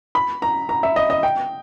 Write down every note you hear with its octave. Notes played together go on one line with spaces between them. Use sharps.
B5
A#5
A#5
E5
D#5
D#5
G5